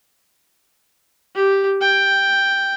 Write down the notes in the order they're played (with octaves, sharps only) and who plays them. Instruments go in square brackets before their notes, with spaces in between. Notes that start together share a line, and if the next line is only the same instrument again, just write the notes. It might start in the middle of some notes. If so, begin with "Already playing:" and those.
[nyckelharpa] G4
G5